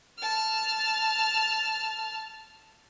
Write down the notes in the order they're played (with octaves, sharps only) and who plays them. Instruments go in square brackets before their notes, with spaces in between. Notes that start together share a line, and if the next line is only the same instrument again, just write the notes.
[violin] A5 F6